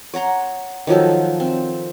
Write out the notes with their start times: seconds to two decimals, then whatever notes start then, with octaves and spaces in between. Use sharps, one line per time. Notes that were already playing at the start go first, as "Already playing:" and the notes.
0.14 C#5 F#5 A#5 C6
0.87 D#3 F3 F#3 A4
1.40 C4